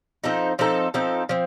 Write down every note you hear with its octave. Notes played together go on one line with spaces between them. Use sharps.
F3 C4 D#4 A4
F3 C4 D#4 A4
F3 C4 D#4 A4
F3 C4